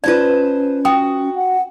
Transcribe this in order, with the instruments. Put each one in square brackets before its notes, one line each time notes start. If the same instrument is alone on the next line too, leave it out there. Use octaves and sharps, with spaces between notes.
[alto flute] C#4 [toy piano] F4 D5 [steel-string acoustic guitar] B4 C5 A5
[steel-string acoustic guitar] F#4 [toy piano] G5 D#6
[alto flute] F#5